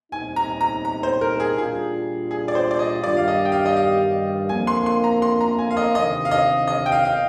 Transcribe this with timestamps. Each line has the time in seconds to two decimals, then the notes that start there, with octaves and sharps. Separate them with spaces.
0.12 A#2 G3 C4 D#4 G#5
0.36 A#5
0.61 A#5
0.85 A#5
1.03 C5
1.21 A#4
1.40 G#4
1.58 A#2 G3 D4 F4 G#4
2.31 G#4
2.48 D5
2.55 C5
2.71 D5
2.79 D#5
3.03 G2 D#3 G3 D5
3.17 F5
3.28 D#5
3.45 G5
3.52 F5
3.66 D#5
3.76 F5
4.49 F2 D3 F3 A#3 G#5
4.67 C6
4.86 C6
5.04 A#5
5.22 C6
5.41 A#5
5.59 G#5
5.71 F5
5.77 D#5
5.95 D2 C3 D#3 D#5
6.25 F5
6.31 D#5
6.67 D#5
6.86 G5
6.92 F5
7.05 F5